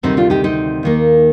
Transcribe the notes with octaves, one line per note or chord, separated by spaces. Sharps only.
D2 C3 D#3 G3 C4 D#4
D4 F4
D#4 G4
C4 D#4
D#2 D#3 A#3